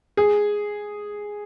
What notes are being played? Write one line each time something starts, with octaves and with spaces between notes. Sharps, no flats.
G#4